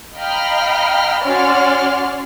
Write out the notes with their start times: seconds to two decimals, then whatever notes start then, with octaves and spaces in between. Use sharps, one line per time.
0.16 D#5 F5 G5 A#5 B5 F6
1.23 C#4 F#4 C#5 D5 C6 F6